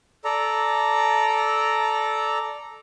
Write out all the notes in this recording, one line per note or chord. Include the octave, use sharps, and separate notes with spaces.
A4 D5 A#5